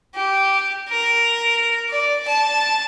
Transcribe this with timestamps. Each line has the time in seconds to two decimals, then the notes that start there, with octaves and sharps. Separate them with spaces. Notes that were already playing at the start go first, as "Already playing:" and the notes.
0.15 G4
0.89 A#4
1.89 D5
2.27 A5